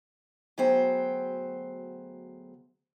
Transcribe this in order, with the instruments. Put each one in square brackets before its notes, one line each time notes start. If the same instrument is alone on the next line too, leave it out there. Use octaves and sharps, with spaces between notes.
[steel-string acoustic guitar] D2 F#3 B3 G#4 C5 G5